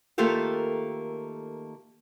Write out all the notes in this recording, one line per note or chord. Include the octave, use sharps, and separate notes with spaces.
D#3 A3 A#3 F4 G4 A4